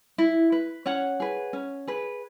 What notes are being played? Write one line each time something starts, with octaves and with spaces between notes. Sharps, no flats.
E4
B4
C#4 C#5 F#5
G#4 B4
C#4
G#4 B4